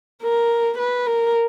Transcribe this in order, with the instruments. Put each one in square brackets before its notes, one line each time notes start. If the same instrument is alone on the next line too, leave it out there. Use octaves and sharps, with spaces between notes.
[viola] A#4
B4
A#4